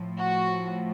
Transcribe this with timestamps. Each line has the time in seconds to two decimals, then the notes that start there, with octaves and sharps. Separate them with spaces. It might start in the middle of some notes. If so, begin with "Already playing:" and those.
Already playing: A2 F3
0.20 F#4